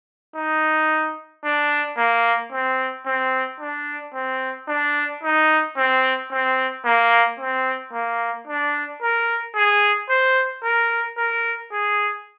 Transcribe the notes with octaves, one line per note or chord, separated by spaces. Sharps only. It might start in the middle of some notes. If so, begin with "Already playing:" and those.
D#4
D4
A#3
C4
C4
D4
C4
D4
D#4
C4
C4
A#3
C4
A#3
D4
A#4
G#4
C5
A#4
A#4
G#4